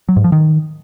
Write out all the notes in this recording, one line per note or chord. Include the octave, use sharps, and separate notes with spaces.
F#3
G#2
F3
D#3